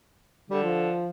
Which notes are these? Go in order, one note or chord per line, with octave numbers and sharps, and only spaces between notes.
D3 G3
F3